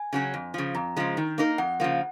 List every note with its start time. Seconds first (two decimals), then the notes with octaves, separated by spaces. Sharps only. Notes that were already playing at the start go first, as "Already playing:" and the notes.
Already playing: G#5
0.13 C#3 F#3 C#4
0.34 F2
0.54 C#3 F3
0.75 F2 A#5
0.97 C#3 F3 G#3
1.17 D#3
1.38 A#3 D#4 A#4
1.58 F2 F#5
1.80 C#3 F3 A#3